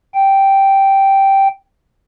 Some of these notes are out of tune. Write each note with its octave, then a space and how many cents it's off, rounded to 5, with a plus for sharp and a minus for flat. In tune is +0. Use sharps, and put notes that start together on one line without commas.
G5 -5